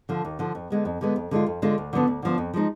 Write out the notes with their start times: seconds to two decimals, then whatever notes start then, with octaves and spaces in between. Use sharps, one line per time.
0.09 D3 F3
0.25 D#2
0.39 D3 F3
0.55 F2
0.70 D3 G#3 B3
0.85 F2
1.01 D3 G#3 B3
1.16 F2
1.31 D3 G#3 D4 F4
1.47 F2
1.62 D3 G#3 D4 F4
1.78 D2
1.93 D3 F3 B3 D4
2.07 D2
2.22 D3 F3 B3 D4
2.38 F2
2.54 F3 G#3 D#4